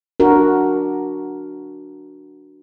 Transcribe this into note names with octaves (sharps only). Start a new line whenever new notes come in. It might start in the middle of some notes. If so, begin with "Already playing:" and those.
D4 F#4 A#4